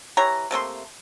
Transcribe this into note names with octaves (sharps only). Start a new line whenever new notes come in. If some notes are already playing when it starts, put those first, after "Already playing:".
E3 G4 C#5 A#5
C3 A3 A#3 C6